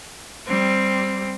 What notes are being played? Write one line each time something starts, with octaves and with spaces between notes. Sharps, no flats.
G3 C4